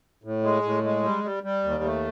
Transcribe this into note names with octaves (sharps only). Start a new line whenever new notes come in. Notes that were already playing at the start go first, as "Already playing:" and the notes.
A2
G#3
A2
G#3
G3
G3
G3
D#2
A3